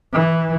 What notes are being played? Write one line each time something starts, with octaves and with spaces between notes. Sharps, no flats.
E3